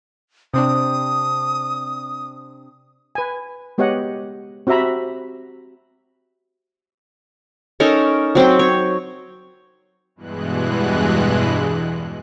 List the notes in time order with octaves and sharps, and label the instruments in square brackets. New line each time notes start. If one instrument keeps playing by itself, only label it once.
[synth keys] C3 C4 D4 [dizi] D#6
[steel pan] B4 G#5
G#3 B3 G4 C#5 D#5 F#5
C4 F#4 G4 E5 A#5 B5
[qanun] C#4 D#4 A4 A#4
F#3 C4 C5 G5
C#5
[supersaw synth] E2 G2 B2 E3 G#3 F#6